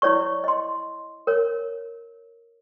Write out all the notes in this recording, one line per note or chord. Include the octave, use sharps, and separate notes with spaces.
E4 C#5 D5 C#6
D#5 C6
A#4 C#5